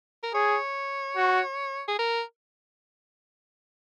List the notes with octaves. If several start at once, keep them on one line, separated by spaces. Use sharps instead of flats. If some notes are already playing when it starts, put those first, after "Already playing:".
A#4
G#4 C#5
F#4
G#4
A#4